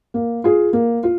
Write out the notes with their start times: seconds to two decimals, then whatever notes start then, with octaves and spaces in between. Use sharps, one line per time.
0.14 A#3
0.44 F4 G#4
0.73 A#3
1.03 F4